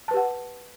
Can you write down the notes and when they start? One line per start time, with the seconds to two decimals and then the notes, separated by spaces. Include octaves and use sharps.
0.08 A5
0.11 B4
0.14 G4
0.17 F#5